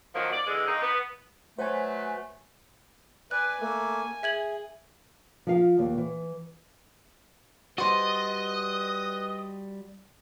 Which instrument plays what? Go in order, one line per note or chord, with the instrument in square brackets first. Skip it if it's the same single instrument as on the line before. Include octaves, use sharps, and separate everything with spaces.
[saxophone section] D#3 F3 F#3 A#3
D5
D3 E3 G#3
A#3 C4 D#4
B3
[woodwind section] F#3 A3 B4 [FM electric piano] C5 G#5
[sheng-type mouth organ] B4 D5 [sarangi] G#5 [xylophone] F#6
[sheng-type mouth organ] A3 A#3 [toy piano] A#4
[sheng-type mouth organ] G#4 [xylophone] E5 G#6 F#7
[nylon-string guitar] F3 F5
D#2
E3
[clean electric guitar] G3 F#4 [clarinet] B4 [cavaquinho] C5 D5 [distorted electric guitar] D#5